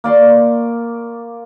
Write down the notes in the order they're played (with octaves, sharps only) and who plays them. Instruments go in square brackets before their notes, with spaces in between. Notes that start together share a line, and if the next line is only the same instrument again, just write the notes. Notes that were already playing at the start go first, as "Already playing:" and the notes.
[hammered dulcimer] A#3 D5 C6 C#6